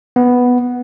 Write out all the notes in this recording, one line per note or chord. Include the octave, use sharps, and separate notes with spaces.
B3